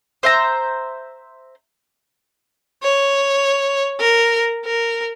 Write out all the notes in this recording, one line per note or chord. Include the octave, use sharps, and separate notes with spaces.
C5 E5 A#5
C#5
A#4
A#4